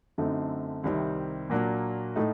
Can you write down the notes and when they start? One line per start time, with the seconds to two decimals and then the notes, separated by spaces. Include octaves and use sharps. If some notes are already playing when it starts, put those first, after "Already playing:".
0.18 F#2 D3 A3 C4 D#4
0.84 C2 C3 D#3 G3 C4
1.50 A#2 F#3 A#3 D4
2.16 A2 A3 D#4